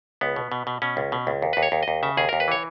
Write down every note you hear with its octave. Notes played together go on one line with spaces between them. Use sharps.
C#2 B3
B2
B2
B2
B2 C#4
C#2
B2
C#2
D#2
D#2 B4
C#5
D#2
D#5
D#2
C#3 E5
D#2 G#4
D#2 A#4
B4
E3 C#5